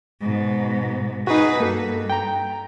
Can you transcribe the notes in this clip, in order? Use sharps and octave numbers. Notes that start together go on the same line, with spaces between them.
G#2 B2
D#4 F#4 G#4 B4
G2 A#3 A4
G5 A#5